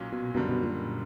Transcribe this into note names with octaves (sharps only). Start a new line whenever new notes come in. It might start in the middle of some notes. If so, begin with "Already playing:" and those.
Already playing: B1 A#2 F#3 A#3 C#4
B2
F#1 F#2 B2 D3 G3
B2
A#2